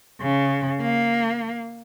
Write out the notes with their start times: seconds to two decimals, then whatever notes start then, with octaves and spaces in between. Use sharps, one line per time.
0.21 C#3
0.81 A#3